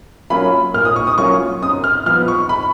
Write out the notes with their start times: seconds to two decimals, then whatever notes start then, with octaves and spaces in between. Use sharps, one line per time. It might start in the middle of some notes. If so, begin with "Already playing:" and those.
0.30 F#3 A#3 C#4 F4 B5
0.74 A#2 F6
0.85 D#6
0.96 C#6
1.07 D#6
1.18 F#3 A#3 C#4 F4 C#6
1.62 F#2 D#6
1.84 F6
2.06 F3 B3 F6
2.28 C#6
2.49 B5